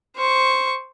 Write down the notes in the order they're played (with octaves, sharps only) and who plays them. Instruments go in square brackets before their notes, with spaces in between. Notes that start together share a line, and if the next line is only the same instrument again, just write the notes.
[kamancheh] C5 C#6